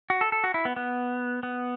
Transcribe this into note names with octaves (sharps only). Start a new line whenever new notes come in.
F#4
A4
A4
F#4
E4
B3
B3
B3